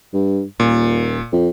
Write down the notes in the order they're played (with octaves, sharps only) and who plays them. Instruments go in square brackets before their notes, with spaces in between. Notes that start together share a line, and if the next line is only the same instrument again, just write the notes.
[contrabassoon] G2
[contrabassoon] D#1 [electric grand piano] A#2
[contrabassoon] F2